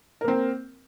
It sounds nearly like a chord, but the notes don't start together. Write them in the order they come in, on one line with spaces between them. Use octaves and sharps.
A#4 A#3 C4